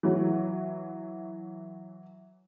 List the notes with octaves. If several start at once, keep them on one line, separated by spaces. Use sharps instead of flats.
E3 F#3